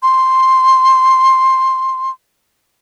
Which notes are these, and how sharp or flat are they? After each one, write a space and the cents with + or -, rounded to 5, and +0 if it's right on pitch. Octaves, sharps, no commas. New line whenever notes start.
C6 +5